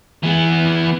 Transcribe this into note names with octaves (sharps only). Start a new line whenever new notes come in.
E3 B3